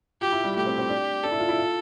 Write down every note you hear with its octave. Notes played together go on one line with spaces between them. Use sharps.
F4 G4
E4
G3
A3 G4
C4
C4
D4
D4 A4
E4
F4
E4
F4